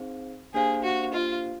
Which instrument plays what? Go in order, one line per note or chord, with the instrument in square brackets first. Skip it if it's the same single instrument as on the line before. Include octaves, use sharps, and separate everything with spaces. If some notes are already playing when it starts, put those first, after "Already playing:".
Already playing: [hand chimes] C4 D#4 G#4 C5 F5
[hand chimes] A#3 D4 G4 C5 F5 [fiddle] G#4
[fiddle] F#4
F4